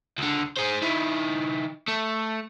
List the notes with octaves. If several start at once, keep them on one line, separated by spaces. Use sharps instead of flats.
C#2 D3
G#4 C5
D#3 E4
A3